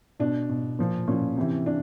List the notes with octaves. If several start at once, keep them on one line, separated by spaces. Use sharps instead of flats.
B2 D4
B2
A#2 F3
A#2 F3 C#4
C3 E3
C3 D4